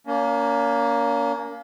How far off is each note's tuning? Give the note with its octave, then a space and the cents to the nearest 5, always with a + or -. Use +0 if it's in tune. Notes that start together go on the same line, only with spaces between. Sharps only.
A#3 +0 C#4 +40